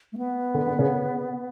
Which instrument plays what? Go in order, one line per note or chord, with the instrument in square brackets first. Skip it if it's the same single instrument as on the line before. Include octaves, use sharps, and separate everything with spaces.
[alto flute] A3
B3
[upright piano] D3
D3
C#3